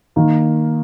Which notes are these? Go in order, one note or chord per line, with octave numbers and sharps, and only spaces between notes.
D#3 A#3 D#4